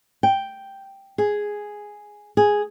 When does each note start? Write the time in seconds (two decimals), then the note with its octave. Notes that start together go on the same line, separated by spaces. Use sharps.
0.23 G5
1.18 G#4
2.37 G#4